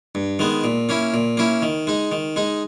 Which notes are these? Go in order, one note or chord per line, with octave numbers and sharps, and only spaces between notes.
G2
D#3 G#3 B3
A#2
A#3 C#4 E4
A#2
A#3 C#4 E4
D#3
G#3 D#4
D#3
G#3 D#4